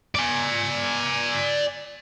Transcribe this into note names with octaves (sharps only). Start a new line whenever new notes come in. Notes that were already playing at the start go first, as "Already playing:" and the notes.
D5 G#5